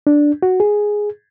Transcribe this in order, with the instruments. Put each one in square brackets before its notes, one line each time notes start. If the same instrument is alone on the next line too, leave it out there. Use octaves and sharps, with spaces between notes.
[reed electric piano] D4
F#4
G#4